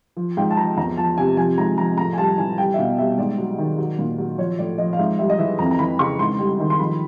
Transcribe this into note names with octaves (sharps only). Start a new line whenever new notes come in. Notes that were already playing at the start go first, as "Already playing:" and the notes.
F3
G#2 G5
A5
F3 A#5
E2 A#5
F3 A5
C3 G#5
F3 G#5
G#2 A#5
F3 A#5
A2 A#5
G#5
G3 A5
E3 G#5
G3 G5
E5
B2 F5
G3 E5
G#2 D5
F#3
D#3
F#3
A#2
F#3
F3 C#5
A2 D5
F3 D#5
F5
G#2 E5
G3 E5
D#5
E3 E5
F2 A#5
A#5
E3 B5
C#3 C#6
G#2 C6
G3
D#3
C6
F3 B5